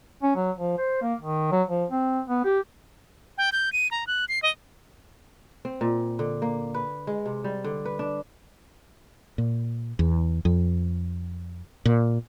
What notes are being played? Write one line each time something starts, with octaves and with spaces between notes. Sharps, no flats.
C#4
F#3
F3
C5
A#3
D#3
F#3
F3
C4
B3
G4
G5
G6
D#7
A#5
F#6
C7
D#5
C4
A#2
D3
A#3
B4
G#3
C3
G3
D3
B4
D4
A#2
E2
F2
A#2